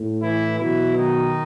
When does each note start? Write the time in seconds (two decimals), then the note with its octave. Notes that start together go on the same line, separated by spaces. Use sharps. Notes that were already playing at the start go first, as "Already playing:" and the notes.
Already playing: A2
0.22 E3 E4
0.59 B2 E3 F#3 E4
0.97 D#3 D#4